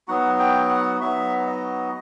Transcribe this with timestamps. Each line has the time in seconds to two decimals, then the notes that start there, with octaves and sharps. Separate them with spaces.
0.08 F#3 B3 D#4 F#4 F#5
0.39 G5
0.69 F#5
1.01 F#3 B3 D#4 F#4 E5
1.46 D#5